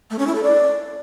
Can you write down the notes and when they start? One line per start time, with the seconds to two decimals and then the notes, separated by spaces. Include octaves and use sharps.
0.10 A3
0.19 C#4
0.27 E4
0.35 A4
0.43 D5